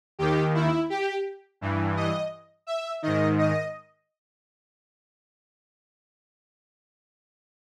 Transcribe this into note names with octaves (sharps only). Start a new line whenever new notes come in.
D#2 D#3 G4
E4
G4
G2 E3
D#5
E5
G#2 D#3 D#5
D#5